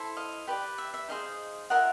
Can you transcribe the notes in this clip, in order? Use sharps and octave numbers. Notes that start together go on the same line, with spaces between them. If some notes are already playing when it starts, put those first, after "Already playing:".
Already playing: E4 A4 C5
D#5 F5
G4 B4 D5
E5
E5
D#4 G#4 C5 D#5 F5
F4 A#4 D#5 E5 F#5